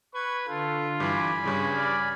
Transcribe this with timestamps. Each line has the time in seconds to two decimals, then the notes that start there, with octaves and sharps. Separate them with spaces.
0.15 B4 C#6 G#6
0.48 D3 F4 A4
1.00 G2 E3 G#5 B5 D6
1.45 G2 C#3 C#5
1.75 D5 F6